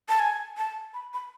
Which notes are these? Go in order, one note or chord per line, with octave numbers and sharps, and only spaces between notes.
A5
G#5
A5
B5
B5